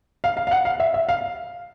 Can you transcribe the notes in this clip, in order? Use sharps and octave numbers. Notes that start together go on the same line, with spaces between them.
F5
F5
F5
F#5
F5
E5
E5
F5